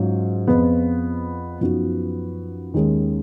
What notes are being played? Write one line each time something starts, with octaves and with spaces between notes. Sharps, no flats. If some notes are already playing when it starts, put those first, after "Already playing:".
Already playing: G#2 F#3 C#4 F4
F2 F3 B3 F4 G#4
F#2 F3 B3 D#4 F#4
D#2 D#3 G#3 C#4 G#4